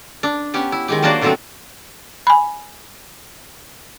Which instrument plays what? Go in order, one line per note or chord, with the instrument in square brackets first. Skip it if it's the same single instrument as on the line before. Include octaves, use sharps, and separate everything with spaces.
[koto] D4
B3 C#4 G4
E4
D#3 G#3 G4
F#3 A#3 D4 F#4 C5 D5
B2 D3 F3 F#3 A3 C4
[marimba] G#5 B5